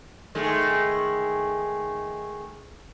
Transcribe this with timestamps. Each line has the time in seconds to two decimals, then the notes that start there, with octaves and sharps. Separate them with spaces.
0.35 D#3 G#3 A3